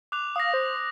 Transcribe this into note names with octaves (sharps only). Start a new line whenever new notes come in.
D6 F#6 F7
F5 D#6 A#6
C5